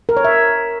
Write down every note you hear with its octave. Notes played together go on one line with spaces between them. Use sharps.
A#4
C#5
E5